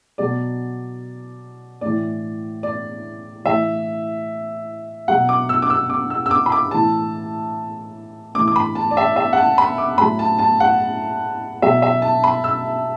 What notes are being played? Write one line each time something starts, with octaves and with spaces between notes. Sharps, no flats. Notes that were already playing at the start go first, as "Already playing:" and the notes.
B2 F#3 D5
A2 E3 D5
D5
A2 E3 E5
B2 F#3 F#5
D6
E6
D6
E6
D6
E6
E6
D6
B5
D6
A2 E3 A5
A2 E3 D6
D6
B5
A5
D5
E5
E5
F#5
A5
B5
D6
A2 F#3 B5
A5
A5
F#5
B2 F#3 E5
E5
A5
B5
E6